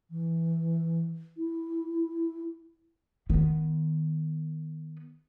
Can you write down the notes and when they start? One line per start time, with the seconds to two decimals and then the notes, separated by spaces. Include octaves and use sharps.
0.10 E3
1.37 E4
3.30 D#3 B3